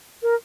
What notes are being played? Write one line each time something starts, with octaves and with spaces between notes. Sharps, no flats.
A#4